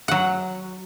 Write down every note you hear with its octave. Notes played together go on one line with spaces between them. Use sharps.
F#3 F#5